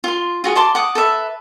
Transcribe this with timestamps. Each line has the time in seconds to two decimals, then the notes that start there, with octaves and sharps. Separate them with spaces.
0.04 F4 C6
0.44 F4 F#4 G#4
0.55 D5 A5 C6 D6
0.75 F#5 D6 D#6
0.95 A4 B4 E5